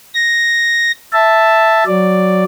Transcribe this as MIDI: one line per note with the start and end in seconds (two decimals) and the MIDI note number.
0.14 0.91 94
1.12 1.83 76
1.12 1.83 81
1.86 2.44 54
1.86 2.44 74